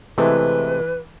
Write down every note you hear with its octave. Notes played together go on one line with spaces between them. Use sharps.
C3 E3 G#3 A3 B4